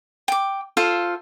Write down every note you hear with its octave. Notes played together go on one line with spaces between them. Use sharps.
G5 D6
F4 A4 C5 F5